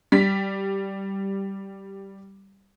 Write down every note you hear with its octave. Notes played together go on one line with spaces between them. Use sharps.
G3 B6